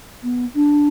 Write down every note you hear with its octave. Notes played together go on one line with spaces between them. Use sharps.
B3
D4